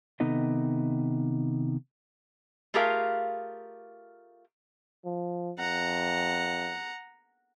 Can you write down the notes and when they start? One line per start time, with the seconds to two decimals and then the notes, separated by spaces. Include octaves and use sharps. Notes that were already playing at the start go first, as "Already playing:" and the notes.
0.20 C3 D#3 B3 D#4 A4 D#5
2.74 A3 F4 G4 G#4 A#4 F5
5.05 F3
5.59 F2 F#5 A#5